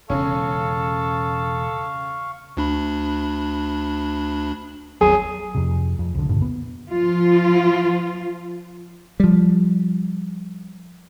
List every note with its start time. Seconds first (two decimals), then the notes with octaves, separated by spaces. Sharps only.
0.10 E1 C#3 C#4 A4 F5 C#6
2.57 D2 D4 B5
5.01 G#1 E2 F#3 G#4
5.55 F2 C3
5.99 F2
6.15 C2 D3
6.29 F1 G2 A#2 D3
6.42 B3
6.90 F3 F4
9.20 F3 G3